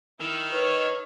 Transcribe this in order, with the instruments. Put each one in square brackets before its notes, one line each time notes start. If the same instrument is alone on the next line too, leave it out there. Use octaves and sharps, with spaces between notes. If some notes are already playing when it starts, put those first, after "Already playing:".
[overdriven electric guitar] D#3 [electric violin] E4 [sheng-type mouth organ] E6 F6
[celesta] B4 [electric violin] C#5